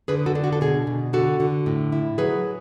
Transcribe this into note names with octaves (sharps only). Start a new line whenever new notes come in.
D3 G#4 B4
F#4 A4
D4
F#4
A4
B2 G#4
B2
D3 F#4 A4
D3
A2
E4
F#3 G#4 B4